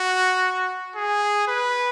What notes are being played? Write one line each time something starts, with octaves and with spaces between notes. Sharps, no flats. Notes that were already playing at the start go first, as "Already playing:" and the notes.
Already playing: F#4
G#4
B4